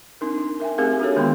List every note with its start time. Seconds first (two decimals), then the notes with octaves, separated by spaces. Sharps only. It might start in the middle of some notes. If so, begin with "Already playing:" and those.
0.21 C4 D4 D#4 A#4
0.38 D#4
0.60 A#4 E5 G5 G#5
0.78 A3 C4 G4 G#4 A#4 F5
1.00 D4 F#4 G#4 A4 C#5
1.16 D#3 G#3 B3 G5 B5 C6